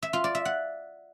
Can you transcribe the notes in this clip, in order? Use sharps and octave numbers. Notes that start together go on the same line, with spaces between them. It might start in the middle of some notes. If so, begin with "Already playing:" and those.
E5
F4
D5
E5
F#5